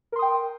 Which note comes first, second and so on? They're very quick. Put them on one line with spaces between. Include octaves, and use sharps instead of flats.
A#4 C6 D#6 G5